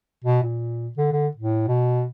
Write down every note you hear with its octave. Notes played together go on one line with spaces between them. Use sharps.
B2
A#2
D3
D3
A2
B2